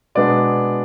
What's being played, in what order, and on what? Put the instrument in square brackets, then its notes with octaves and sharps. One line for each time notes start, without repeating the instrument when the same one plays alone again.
[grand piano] B2 G#3 B3 D4 D5